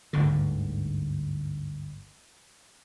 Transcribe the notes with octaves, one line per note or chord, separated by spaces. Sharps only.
G1 D2 G#2 D3